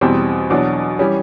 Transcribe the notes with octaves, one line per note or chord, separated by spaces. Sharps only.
E2 B2 G3 C4
E2 B2 F#3 D4
E3 G3 C#4